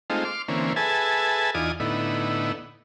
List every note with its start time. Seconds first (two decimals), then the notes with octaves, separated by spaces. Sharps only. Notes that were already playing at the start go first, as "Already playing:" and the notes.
0.10 G#3 A3 C4 D#4 F4
0.25 C6 D6 F6
0.48 D3 E3 A#3 C4 C#4
0.76 G#4 A4 B4 E5 G#5 A5
1.54 E2 D#4 F4 D5 G#5 D#6
1.80 A2 D3 B3 D#4 E4